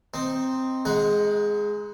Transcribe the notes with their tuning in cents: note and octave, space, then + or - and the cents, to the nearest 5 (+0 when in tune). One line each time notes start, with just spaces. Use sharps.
C4 +0 D#4 +0
G#3 +0 D#4 +35 F#5 +0